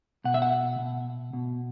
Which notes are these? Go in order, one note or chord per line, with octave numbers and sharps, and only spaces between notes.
B2 F#5
E5
F#5
B2
B2